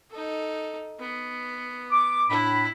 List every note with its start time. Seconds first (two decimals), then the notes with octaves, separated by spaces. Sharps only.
0.10 D#4 A4
0.99 B3
1.91 D6
2.30 A2 D4 E4 B5